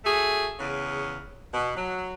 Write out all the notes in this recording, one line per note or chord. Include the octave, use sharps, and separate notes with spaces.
A3 F#4 G#4
E2 C#3
B2
F#3